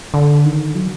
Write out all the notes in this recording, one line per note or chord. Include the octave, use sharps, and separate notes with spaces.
D3
D#3
F#3